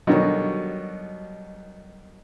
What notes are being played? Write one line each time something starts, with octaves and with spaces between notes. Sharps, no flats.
B2 D3 D#3 F#3 G3 C#5